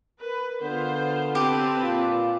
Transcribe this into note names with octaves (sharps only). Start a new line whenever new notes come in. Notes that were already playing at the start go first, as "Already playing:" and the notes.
A#4 B4
D3 B3 F4 C5
C4 G4 B4 A5
A#2 F4